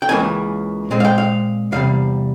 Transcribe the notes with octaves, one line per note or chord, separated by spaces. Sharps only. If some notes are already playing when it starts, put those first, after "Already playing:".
G5
C#2 C#3 E3 A#3 G#5
A#2 G#3 C4
F5
G5
F5
E2 C3 G3 F5